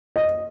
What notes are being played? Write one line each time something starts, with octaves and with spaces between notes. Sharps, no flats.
D#5